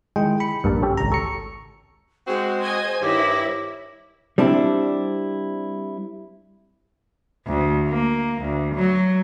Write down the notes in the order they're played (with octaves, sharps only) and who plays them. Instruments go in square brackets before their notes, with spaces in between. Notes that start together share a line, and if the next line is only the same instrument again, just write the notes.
[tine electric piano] D#3 E4 G5 [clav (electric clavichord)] G#3
[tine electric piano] B5 C#7
[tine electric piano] A#1 [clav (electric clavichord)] G2 A#3 A5
[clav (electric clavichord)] C#4 G4 A4
[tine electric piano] G#1 C#2 A#5
[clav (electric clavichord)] A4 [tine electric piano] C#6 C#7
[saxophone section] G#3 C4 F#4 [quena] C5
[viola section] D#5 G#5
[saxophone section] G2 D#3 [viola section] E4 [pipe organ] C#5 D6 A#6
[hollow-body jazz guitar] G3 C4 D4 E4
[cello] D2
A#3
D2
F#3